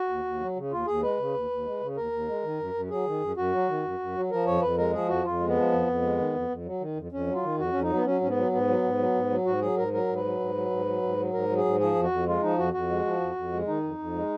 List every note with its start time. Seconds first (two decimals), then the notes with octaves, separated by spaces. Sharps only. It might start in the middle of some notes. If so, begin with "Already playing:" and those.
Already playing: F#4
0.09 D#2
0.25 D#2
0.41 F#3
0.56 C#3
0.72 D#2 F4
0.87 D#2 G#4
1.03 G#3 B4
1.18 C#3
1.34 D#2
1.50 D#2
1.66 G#3
1.81 C#3
1.96 D#2 A#4
2.12 D#2
2.28 G#3
2.44 D#3
2.59 F#2
2.74 F#2
2.90 F#3 G#4
3.06 D#3
3.21 F#2
3.36 F#2 F#4
3.52 F#3
3.69 D#3
3.84 F#2
3.99 F#2
4.15 F#3
4.31 F3 A#4
4.46 F2 C#5
4.62 F2 B4
4.77 G#3 A#4
4.93 F3 G#4
5.09 F2 F#4
5.25 F2 F4
5.40 G#3
5.48 B3
5.56 F3
5.71 F2
5.87 F2
6.02 G#3
6.18 D#3
6.33 F2
6.50 F2
6.65 F#3
6.81 D#3
6.96 F2
7.12 F2 C#4
7.27 F#3
7.35 F4
7.43 D#3
7.58 F2 F#4
7.72 F2 C#4
7.82 D#4
7.89 F#3
7.96 B3
8.05 F#3 C#4
8.21 G#2 C#4
8.29 B3
8.37 F#3
8.52 G#2 B3
8.68 F#3
8.83 G#2
8.99 F#3
9.14 G#2
9.30 F#3
9.46 G#2 F#4
9.61 F#3 G#4
9.77 G#2 A#4
9.93 F#3 A#4
10.08 G#2
10.16 B4
10.24 F#3
10.39 G#2
10.55 F#3
10.70 G#2
10.86 F#3
11.02 G#2
11.17 F#3
11.33 G#2 A#4
11.49 F#3
11.57 G#4
11.65 G#2
11.80 F3 G#4
11.95 F2
12.03 F#4
12.11 F2
12.27 G#3 F4
12.43 F3 D#4
12.58 F2 F#4
12.73 F2 F#4
12.89 G#3
13.05 F3
13.20 F2
13.36 F2
13.52 G#3
13.67 D#3 D#4
13.83 F2
13.98 F2
14.14 G#3